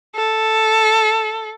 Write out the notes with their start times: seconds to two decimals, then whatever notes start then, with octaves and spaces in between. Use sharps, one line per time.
0.15 A4